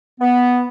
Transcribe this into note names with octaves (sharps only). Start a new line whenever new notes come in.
B3